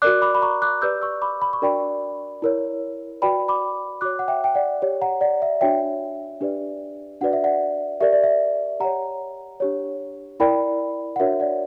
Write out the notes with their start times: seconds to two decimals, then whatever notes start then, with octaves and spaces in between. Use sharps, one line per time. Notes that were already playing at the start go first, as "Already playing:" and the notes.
0.02 F#4 A#4 D5 D6 F#6
0.22 B5 D6
0.35 B5
0.42 A#5 C#6
0.62 D6 F#6
0.82 G4 B4 D5 E6 G6
1.02 C#6 E6
1.22 B5 D6
1.42 B5
1.53 C#6
1.62 D4 F#4 A#4 D5 G5 B5
2.42 E4 A#4 C#5
3.22 F#4 B4 D5 G5 B5
3.48 B5 D6
4.01 F#4 C#5 D6 F#6
4.19 F#5
4.28 E5 G5
4.44 G5
4.55 D5 F#5
4.82 G4 C#5
5.02 F#5 A#5
5.21 D5 F#5
5.42 E5
5.61 D4 F#4 C#5 E5 G5
6.41 D4 G4 B4 D5
7.21 D4 F#4 B4 D5 F#5
7.33 E5
7.44 D5 F#5
8.00 G4 A#4 D5 E5
8.13 D5
8.23 E5
8.80 G4 C#5 F#5 A#5
9.60 D4 G4 C#5
10.40 E4 A#4 D5 G5 B5
11.16 F#5
11.20 D4 F#4 A#4 C#5 E5
11.40 D5 F#5